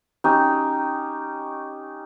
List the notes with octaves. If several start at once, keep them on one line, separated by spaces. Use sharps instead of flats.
C#4 D#4 G4